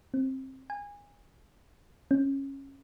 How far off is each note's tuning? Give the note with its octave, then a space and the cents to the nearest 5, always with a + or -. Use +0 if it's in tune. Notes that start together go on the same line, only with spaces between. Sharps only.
C4 +20
G#5 -25
C#4 -15